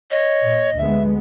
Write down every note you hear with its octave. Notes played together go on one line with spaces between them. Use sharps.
C#5 D#5
A#2
D2 G#3 B3 E5